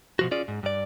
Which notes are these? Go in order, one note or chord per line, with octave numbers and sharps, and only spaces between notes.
B2 F3 F#4
C#4 F4 G#4 D5
G#2
G2 D5